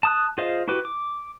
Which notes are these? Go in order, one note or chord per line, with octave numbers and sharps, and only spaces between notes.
A5 D#6 F#6
F4 G#4 C5 D#5 F5
E4 F#4 G4 B4
D6